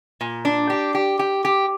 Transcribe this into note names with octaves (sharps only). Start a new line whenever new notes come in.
A#2
D4
G4
G4
G4
G4